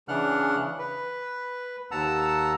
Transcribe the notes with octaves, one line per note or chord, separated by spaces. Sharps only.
C#3 E3 D4 F#5 F6 F#6
B4
D#2 F#5 A5 A#5 E6